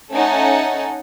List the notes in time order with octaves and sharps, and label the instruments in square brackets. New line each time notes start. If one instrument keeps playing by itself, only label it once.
[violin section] A3 C#4 D#4 A4 F#5 G#5